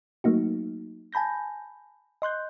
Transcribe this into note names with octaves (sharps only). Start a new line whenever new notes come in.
F#3 A3 A#3 D#4 F#4
G#5 A5 B5 G6 A#6
D#5 C6 F#6 G6